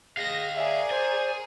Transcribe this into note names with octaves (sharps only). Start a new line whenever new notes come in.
G#4 D#5 F5 A#6
G#4 A#4 C#5 D5 E5
C5 G#5